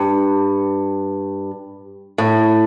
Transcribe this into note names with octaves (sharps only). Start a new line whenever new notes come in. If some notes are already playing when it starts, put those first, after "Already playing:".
Already playing: G2
A2